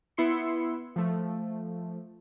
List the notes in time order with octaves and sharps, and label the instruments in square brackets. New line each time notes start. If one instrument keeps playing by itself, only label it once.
[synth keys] B3 E4 C6 C#7
F3 A3